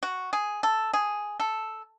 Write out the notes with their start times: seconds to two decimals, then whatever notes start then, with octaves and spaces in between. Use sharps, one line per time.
0.03 F#4
0.33 G#4
0.63 A4
0.93 G#4
1.40 A4